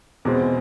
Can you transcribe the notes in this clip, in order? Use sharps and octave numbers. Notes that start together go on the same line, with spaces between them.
E2 B2 G#3 C4